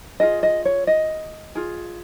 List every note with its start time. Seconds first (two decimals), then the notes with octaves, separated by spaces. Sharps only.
0.20 F4 G#4 D#5
0.43 D#5
0.65 C#5
0.87 D#5
1.55 F4 G#4